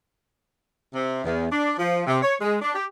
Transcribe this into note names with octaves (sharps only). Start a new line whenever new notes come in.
C3
E2
D4
F3
C3
C#5
G#3
D4
G4